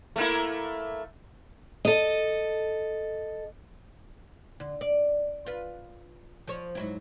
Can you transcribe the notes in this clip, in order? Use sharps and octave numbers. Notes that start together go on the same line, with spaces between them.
A3 A#3 E4
A4 D#5
D3
D5
F4 B4
F3 C#5
G#2 F#3 E4